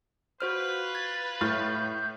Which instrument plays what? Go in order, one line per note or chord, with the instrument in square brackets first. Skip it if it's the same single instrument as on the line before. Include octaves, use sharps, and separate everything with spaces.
[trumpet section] F4 B4 [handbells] F#4 C5 F6
[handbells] G#6 [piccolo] A6
[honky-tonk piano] A2 F6 A6 [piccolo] G6